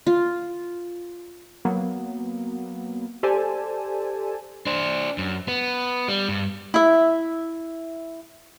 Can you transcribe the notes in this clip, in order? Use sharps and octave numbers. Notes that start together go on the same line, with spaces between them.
F4
F#3 A#3 B3
G4 A4 C5 D5 G#5 A5
D4 C5
F#2
B3
G3
G2
E4 E5